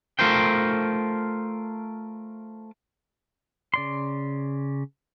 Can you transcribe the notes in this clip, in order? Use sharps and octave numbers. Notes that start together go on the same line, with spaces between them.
A3 F4 A#4 C5 G5
C#3 D5 C6